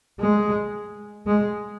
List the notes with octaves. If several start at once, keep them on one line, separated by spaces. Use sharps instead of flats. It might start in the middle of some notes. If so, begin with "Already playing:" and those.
G#3
G#3